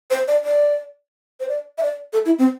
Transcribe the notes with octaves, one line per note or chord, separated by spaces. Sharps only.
C5
D5
D5
C5
D5
E5
D5
A4
E4
C4